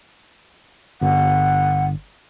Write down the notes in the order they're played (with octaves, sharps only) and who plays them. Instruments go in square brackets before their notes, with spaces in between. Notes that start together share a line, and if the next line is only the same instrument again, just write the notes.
[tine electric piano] G1 [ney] F#5